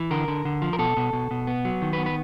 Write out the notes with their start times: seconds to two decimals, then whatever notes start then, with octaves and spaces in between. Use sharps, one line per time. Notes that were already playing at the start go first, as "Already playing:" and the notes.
Already playing: E3
0.11 D3 A#4
0.28 D3
0.45 D3
0.62 F3
0.73 A#4
0.79 B2 A4
0.97 B2
1.13 B2
1.31 B2
1.47 B3
1.65 F#3
1.82 D#3
1.93 B4
1.98 B3
2.06 B4